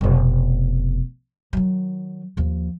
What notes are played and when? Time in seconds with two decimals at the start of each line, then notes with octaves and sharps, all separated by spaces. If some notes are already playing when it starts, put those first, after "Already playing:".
0.01 F1 B2
1.53 D#3 F#3
2.37 D#2 F3